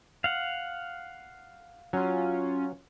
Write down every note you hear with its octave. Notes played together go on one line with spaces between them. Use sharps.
F5 F#5
F#3 C#4 F4